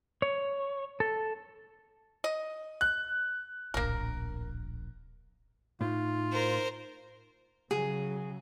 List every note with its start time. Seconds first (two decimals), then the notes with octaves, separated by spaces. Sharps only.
0.22 C#5
1.00 A4
2.24 D#5
2.81 F#6
3.74 D1 A#1 A#3 A#4
5.81 A2 D#4 F4
6.33 A#4 C5
7.71 C#3 F#3 G#4